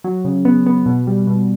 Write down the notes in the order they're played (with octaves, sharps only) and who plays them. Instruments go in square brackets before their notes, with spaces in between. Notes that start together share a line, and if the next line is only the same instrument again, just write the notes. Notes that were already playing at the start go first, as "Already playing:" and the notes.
[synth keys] F#3
C#3
B3
B3
B2
G3
B2